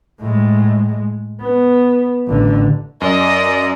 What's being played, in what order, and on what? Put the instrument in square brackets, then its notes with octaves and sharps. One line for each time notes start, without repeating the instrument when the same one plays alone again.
[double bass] A2 G#3
B3
A1 D3
[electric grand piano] F#2 [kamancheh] D5 [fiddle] D#5